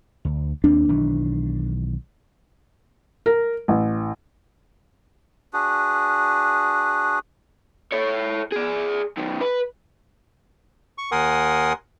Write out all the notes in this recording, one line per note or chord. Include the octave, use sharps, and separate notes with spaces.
D2
D#2 A#3 C4 D4
B1 D#3 E3
A#4
A1
D4 F#4 G#4 B4
A4 C#5
G#4 D5
F#2 D#3
B4
C#6
D#2 A#4 F#5 G#5 C6 D#6